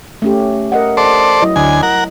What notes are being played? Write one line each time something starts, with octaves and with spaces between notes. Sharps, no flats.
A3 C#4 G4
A#4 D#5 F#5
A4 C5 D5
F#3 E4 D#5
D2 G#5
A#4 F#5